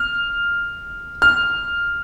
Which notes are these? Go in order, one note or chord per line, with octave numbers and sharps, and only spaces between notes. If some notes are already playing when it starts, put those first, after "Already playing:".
Already playing: F6
F6